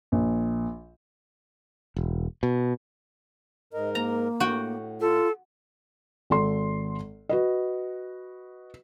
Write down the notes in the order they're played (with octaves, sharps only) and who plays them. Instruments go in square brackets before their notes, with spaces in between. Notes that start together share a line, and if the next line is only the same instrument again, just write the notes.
[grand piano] A#1
[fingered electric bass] E1
B2
[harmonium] G#2 A#4 [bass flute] D#5
[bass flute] A#3 [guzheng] A#5
[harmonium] A2 [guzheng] F#4 G5
[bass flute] F4 [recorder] A4
[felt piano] G#1 A4 C6
F#4 B4 D#5